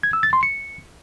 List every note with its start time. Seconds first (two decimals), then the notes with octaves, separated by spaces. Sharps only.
0.03 G#6
0.13 E6
0.23 A6
0.33 C6
0.43 C#7